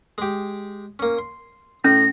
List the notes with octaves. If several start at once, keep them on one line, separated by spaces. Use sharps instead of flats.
G#3 G4
A#3 C#4
C6
A2 C#4 A#6